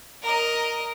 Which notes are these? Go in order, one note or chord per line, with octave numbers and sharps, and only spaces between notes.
A#4 D#5